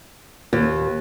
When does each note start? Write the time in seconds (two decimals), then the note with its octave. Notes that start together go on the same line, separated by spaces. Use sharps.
0.53 D#2